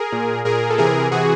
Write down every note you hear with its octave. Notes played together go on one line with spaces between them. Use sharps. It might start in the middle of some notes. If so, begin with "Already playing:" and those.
Already playing: G#4 A#4
A#2
A#2 G#4 A#4
A4
C3 E3 G#4 A#4
C3 E3 F#4 G#4